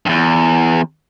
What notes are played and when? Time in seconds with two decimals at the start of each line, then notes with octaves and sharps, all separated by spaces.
0.06 E2 G2